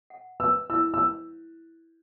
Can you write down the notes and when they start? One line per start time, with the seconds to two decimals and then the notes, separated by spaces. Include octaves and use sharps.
0.10 F#5
0.40 B4 E6
0.70 E4 E6
0.94 E6